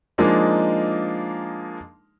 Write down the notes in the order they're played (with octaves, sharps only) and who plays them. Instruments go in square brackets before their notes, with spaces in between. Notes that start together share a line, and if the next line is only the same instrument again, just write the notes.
[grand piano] F3 G#3 A#3 D4 D#4